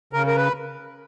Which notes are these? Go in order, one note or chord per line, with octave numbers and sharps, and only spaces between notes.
C#3 A#4
A#4
B4